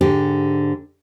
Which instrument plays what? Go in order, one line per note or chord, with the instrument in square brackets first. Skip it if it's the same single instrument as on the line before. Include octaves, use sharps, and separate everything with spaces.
[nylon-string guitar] G#2 D3 G4